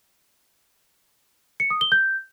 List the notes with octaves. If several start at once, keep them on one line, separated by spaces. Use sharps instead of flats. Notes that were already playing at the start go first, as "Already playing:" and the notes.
C#7
D#6
G7
G6